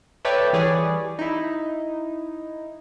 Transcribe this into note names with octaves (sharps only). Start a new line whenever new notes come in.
A4 B4 C#5 D5 E5 G5
E3 G3 G#4 B4 C#5 D5
D#4 E4